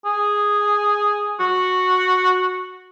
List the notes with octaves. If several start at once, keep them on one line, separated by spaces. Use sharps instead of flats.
G#4
F#4